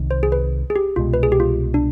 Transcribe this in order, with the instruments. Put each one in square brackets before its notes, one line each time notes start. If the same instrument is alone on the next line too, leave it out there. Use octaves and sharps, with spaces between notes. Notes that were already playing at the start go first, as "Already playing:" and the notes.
Already playing: [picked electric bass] C2 C3 D#3
[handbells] C5
G#4
B4
G#4
G4
[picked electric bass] C2 B2 G#3 [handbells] F4
[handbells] B4
G#4
G4
F4
D4